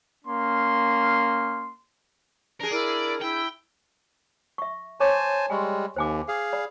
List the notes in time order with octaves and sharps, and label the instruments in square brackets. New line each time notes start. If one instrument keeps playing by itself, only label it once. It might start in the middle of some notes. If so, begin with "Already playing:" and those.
[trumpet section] A#3 C#4 C6
[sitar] D4 G#4 [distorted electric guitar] A#4
[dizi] E4 [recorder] A#4 [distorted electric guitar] D5
[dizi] E4 [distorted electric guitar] G5
[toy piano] E5 C#6
[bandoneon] C5 G#5 A5 [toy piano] C#5 C#6 D6
[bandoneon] G3 G#3 [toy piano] G#5 C6 C#6
[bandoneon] D#2 [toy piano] C5 G#5 D6
[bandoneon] G#4 F5
[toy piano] D5 B5